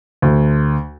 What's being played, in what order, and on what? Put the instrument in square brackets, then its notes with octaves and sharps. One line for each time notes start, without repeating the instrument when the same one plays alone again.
[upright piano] D2